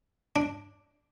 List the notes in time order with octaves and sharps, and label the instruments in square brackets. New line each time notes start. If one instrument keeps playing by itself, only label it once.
[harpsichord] D4